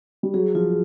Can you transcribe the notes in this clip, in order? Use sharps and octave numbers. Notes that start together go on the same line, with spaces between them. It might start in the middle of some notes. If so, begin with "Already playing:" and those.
G3
F#3 G#4
F3 F4